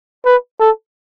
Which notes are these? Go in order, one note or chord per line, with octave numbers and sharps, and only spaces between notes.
B4
A4